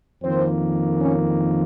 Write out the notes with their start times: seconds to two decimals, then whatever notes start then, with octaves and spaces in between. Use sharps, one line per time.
0.22 F2 D#3 A#3 C4 C5
1.01 C#4 C#5